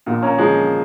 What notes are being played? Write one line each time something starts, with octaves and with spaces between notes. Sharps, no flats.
A#1 A#2
A#3 C#4
F3 G#3